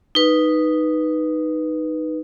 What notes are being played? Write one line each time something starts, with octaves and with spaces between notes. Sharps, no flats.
D#4 B4